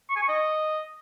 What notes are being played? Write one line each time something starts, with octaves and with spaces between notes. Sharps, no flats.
C#6
G#5
C#6
D#5